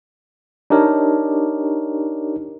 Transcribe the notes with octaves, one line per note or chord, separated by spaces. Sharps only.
D4 D#4 G4 A#4 C#5